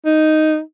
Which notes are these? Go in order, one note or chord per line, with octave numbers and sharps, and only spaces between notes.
D#4